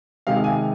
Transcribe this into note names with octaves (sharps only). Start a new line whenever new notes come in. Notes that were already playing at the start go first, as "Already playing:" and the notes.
C3 D#3 G#3 D#4 F5
G#5